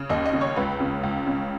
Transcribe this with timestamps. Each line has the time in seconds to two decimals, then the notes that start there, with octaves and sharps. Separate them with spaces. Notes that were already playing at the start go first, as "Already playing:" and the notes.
Already playing: C#3
0.10 D#2 D#5
0.26 D#5
0.33 C#3
0.41 C#5
0.56 C#2 B4
0.80 C#3
1.03 C#2
1.27 C#3